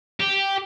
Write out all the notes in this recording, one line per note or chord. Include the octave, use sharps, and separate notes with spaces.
G4